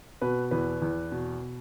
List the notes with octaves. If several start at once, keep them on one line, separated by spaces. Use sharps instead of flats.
B2 B4
E2 B4
E2
B2